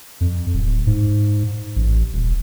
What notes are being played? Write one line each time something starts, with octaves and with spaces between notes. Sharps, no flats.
F2
D1
G#2
A1
D#1